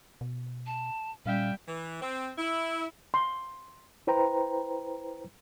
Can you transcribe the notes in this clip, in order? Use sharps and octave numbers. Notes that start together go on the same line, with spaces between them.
B2
A5
A#2 G3 C#4 E5 F5 G5
E3
C4
E4
C6
E4 B4 C5 G5 A#5